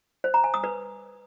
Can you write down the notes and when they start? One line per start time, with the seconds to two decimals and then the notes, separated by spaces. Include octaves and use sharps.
0.24 C5
0.34 A#5
0.44 G#5
0.54 D#6
0.64 B4